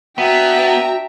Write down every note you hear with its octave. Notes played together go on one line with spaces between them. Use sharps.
B3 D4 F#4 E5 G5 A#5